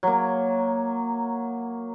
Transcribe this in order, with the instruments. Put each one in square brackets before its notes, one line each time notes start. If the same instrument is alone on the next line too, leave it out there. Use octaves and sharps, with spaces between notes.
[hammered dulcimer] F#3 A#3